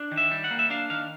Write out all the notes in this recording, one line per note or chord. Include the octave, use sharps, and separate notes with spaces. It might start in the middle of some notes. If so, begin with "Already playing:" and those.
Already playing: D4
D#3
E5
G3
F#5
A#3
E5
D4 F5
D#3 F5